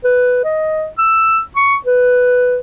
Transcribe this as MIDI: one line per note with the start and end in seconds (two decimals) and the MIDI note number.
0.04 0.40 71
0.45 0.87 75
0.98 1.41 88
1.56 1.76 85
1.86 2.59 71